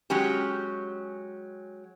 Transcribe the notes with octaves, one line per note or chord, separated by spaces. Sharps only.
F#3 G#3 C#4 G4